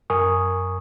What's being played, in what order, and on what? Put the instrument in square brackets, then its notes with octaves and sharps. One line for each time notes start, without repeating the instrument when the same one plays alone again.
[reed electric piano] F#2 A#4 G#5 C#6 D#6